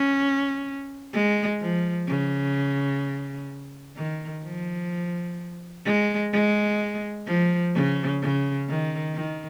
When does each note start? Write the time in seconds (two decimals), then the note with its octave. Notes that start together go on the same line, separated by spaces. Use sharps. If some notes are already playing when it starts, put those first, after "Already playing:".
Already playing: C#4
1.13 G#3
1.60 F3
2.08 C#3
3.96 D#3
4.44 F3
5.85 G#3
6.33 G#3
7.26 F3
7.74 C#3
8.22 C#3
8.69 D#3
9.15 D#3